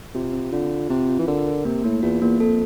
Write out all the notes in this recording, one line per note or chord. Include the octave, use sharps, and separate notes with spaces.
C3 F4
C4
D3 F4
F4
C3 C4
F4
E3
D3 A#4
A#4
C3 A#3
A2 A#3
E2 F4
E2 A#3
F2 A4